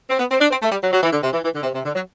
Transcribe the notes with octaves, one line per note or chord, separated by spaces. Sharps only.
C4
B3
C4
D4
C4
A3
G3
F#3
F#3
E3
D3
C3
E3
E3
D3
C3
C3
D3
F#3